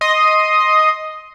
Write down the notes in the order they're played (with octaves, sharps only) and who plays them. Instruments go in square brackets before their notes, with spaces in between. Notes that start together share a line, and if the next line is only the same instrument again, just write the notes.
[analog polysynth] D#5 C6 D#6